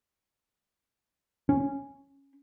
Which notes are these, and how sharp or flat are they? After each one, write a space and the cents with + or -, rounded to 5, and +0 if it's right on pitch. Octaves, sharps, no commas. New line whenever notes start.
C#4 -5